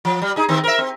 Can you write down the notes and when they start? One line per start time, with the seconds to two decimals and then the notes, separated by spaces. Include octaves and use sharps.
0.05 F3
0.22 G3
0.36 D#4 G#4
0.49 D#3 C4
0.64 A#4 E5
0.78 C4